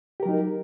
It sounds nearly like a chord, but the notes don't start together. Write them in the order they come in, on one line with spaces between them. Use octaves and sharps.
G4 A#4 F#3 D#4